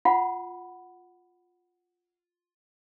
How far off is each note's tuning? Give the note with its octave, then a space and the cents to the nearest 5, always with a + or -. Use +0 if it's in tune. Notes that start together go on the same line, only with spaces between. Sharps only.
F4 +10 F#5 +0 B5 +0